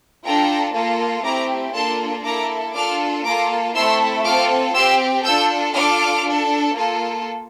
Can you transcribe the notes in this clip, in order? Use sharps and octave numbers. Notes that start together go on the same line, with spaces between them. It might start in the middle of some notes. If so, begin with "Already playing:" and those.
D4 F4 A4 G5 A#5
A#3 F4 A4
A3 C4 E4 G4 A#5 D6
A#3 D4 F4 A4 A5 C6
A#3 E4 A4 A#5 D6
D4 F4 A4 D6 F6
A#3 F4 A4 A#5 D6
A3 C4 E4 A4 C6 E6
C4 F4 A4 D6 F6
C4 G4 C6 E6
D4 F4 A4 E6 G6
D4 F4 A4 D6 F6
D4 A4
A#3 F4 A4